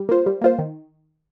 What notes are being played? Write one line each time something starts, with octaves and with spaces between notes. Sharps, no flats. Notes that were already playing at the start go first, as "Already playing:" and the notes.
Already playing: G3
A#3 F4 C5
G3
A#3 F4 C5
D#3